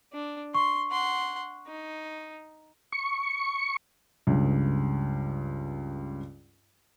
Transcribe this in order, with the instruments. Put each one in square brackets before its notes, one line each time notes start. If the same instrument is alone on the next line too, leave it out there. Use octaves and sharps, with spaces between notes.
[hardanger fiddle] D4
[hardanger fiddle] C6 [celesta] C#6
[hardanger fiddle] F#5 C6
D#4
[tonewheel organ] C#6
[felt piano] C#2 G2